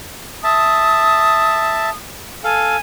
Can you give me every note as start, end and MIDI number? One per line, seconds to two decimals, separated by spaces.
0.44 1.90 76
0.44 1.90 81
0.44 1.97 87
2.44 2.77 69
2.44 2.77 77
2.44 2.80 80